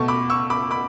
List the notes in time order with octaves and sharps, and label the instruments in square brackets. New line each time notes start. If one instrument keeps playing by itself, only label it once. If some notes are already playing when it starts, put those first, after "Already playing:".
Already playing: [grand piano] B2 A3 A5 C#6
B5 D6
C#6 E6
B5 D6
B5 D6